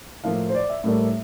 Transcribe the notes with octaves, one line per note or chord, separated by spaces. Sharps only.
A2 F3 A#3 E4 F5
C5
D5
E5
A2 G3 A#3 D4